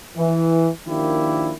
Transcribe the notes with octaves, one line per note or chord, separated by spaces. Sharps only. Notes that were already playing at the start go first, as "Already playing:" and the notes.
E3
D#3 F3 A#3 D4 E4 G4